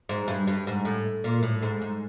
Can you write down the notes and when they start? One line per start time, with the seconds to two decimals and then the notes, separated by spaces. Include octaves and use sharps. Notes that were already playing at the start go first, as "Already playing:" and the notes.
0.09 G#2
0.28 G2
0.48 G2
0.67 G#2
0.85 A2
1.24 A#2
1.43 A2
1.62 G#2
1.82 G#2